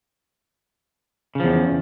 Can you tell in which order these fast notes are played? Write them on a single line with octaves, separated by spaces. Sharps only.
C#3 F3 E2